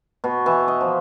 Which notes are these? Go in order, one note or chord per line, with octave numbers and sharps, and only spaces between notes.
B2
E3
D#5
F3